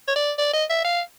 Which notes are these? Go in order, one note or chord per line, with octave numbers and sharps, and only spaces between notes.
C#5
D5
D5
D#5
E5
F5